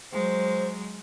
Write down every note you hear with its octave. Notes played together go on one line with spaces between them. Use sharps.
F#3 G#3 C5